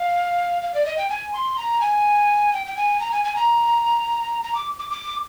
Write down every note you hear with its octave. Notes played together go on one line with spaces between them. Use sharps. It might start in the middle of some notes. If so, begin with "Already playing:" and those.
Already playing: F5
F5
D5
D#5
G5
G#5
C6
A#5
G#5
G5
G5
G#5
A#5
G#5
G#5
A#5
A#5
D6
D6
D6